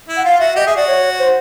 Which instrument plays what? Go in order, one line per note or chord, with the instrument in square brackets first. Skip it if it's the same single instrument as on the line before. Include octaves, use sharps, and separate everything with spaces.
[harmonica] E4
[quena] F#5
[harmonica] F4 [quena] F5
[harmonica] F#4 [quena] E5
[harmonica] G4 [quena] D#5
[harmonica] G#4 [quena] E5
[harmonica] F#4 [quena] D5
[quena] C#5
C5